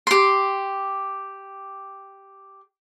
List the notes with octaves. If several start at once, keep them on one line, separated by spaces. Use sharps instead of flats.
G4 C6